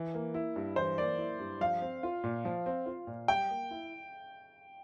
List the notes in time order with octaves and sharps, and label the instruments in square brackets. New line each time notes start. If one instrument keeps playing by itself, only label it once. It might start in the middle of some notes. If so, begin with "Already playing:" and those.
Already playing: [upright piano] E3
A#3
E4
G2
[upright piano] E3 [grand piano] C5
[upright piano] A#3 [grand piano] D5
[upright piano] E4
G2
[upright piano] F3 [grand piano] F5
[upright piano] C4
F4
A#2
F3
C4
F4
A#2
[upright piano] G3 [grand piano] G5
[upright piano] A#3
E4